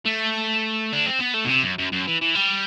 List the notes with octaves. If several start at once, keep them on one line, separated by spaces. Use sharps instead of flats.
A3
D4
C4
B3
A3
B2
C3
F#2
F#2
F#2
E3
E3
G3